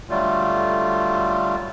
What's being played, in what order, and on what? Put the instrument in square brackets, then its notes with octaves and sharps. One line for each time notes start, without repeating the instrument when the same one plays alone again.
[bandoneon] D3 F#3 G3 A3 F4